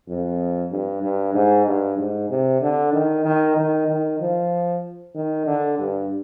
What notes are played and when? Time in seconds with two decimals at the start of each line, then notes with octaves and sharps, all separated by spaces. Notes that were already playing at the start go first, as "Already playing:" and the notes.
0.08 F2
0.71 G2
1.03 G2
1.34 G#2
1.66 G2
1.97 G#2
2.30 C3
2.62 D3
2.93 D#3
3.25 D#3
3.56 D#3
3.88 D#3
4.20 F3
5.15 D#3
5.46 D3
5.79 G2